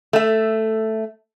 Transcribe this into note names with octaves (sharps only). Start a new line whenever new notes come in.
A3 E5